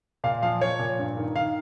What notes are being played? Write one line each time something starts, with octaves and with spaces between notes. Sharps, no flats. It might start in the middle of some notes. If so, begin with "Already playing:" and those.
A#2 F5
F3 F5
F3 C#5
A#2
G2
D#3
D#3 F5